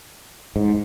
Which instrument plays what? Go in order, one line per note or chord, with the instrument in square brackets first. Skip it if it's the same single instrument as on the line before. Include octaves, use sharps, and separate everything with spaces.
[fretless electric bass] G#2